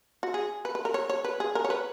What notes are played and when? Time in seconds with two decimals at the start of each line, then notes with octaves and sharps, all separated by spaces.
0.23 F#4
0.34 G#4
0.65 B4
0.75 B4
0.85 A#4
0.94 C#5
1.09 C#5
1.25 B4
1.40 G#4
1.55 A#4
1.65 C#5
1.70 B4